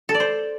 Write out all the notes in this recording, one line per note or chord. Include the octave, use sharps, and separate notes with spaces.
A4
D5
C5